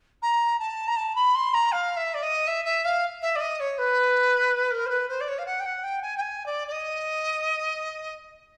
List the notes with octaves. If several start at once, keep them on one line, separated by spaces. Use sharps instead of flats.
A#5
A5
A#5
A5
B5
C6
A#5
F5
E5
D5
D#5
E5
E5
F5
E5
D5
D#5
C#5
B4
A#4
C5
B4
C5
D5
C#5
F5
F#5
G5
F#5
G5
G#5
G5
G#5
D5
D5
D#5